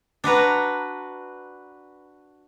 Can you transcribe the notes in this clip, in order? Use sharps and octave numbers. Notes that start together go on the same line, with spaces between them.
D4 F#4 B4 A#5